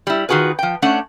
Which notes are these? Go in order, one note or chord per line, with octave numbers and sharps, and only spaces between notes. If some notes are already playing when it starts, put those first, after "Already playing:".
G3 E4
D#3 F4 F#4 G#4 B4
F3 G5
A3 C#4 D4 F#5